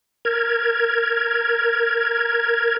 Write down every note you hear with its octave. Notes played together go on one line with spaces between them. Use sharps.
A#4 G#6